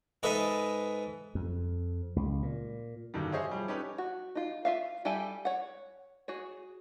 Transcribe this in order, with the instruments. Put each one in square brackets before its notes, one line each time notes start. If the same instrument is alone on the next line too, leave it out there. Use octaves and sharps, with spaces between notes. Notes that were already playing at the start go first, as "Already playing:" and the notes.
[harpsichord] G#2 A4 B4 D#5 E5
[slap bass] F2
C#2
A#2
[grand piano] G2 B2 D3 D#3 G3
G#4 C5 C#5 D#5 E5 F#5
F3 G3
C#4 D#4 G4 A4 B4
[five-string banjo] F#4
D#4 F4
F4 E5 F5
G3 G4 A4 E5 G#5
C#5 F#5
F#4 G#4 C#5